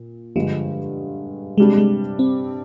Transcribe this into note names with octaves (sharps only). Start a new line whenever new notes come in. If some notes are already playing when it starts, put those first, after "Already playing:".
Already playing: A#2
G2 D3 F3 G#3
C3 G3 G#3 D4
G#3
C4